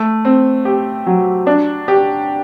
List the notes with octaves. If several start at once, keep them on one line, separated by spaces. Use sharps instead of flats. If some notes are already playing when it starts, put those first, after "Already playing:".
Already playing: A3
C4
G4
F#3
D4
G4